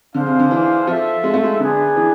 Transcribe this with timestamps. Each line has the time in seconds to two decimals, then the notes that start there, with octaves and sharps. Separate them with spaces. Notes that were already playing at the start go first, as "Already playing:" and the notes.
0.14 D3 D4 G#4 C5 F5
0.26 C3
0.39 D3
0.51 E3
0.87 F3 F4 A4 E5
1.24 G#3
1.34 A3
1.44 G#3
1.59 D3 B3 D4 G#4
1.96 E3